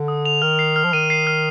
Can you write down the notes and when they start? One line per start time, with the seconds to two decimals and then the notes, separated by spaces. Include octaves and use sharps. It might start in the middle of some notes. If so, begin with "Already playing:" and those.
Already playing: D3
0.08 D#6
0.25 F7
0.42 D#3 F6
0.59 C7
0.76 F6
0.84 F3
0.93 D#3 D#7
1.10 C7
1.27 F6